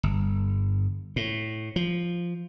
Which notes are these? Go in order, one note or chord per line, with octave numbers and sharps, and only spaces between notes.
G1
A2
F3